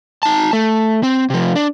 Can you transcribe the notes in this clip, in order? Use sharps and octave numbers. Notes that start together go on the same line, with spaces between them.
D#4 A5
A3
C4
C3 F3
D4